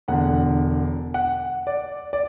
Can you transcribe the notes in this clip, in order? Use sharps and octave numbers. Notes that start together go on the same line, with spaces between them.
E1 E2 D3 F#5
F#5
D5
D5